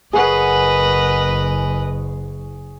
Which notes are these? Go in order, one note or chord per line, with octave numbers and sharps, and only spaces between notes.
F#1 G#4 A#4 B4 C#5 D#5 F#5